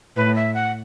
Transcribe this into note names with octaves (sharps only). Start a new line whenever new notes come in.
A2 B4
E5
F#5